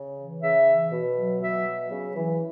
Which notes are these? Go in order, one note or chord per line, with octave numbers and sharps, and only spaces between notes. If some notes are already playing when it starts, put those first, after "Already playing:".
Already playing: C#3
E3
C#3 E5
E3
B2
F#3
B2 E5
F#3
C#3
E3